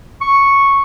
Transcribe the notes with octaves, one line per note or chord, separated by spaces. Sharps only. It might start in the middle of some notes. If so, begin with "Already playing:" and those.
C#6